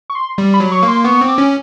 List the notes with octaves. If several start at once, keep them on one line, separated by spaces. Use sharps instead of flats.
C#6
C6
G3
B5
F#3
C#6
A#3
C6
B3 C#6
C4
D6
C#4